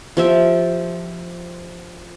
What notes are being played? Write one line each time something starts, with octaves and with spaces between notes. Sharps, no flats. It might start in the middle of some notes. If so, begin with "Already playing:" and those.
F3 G4 E5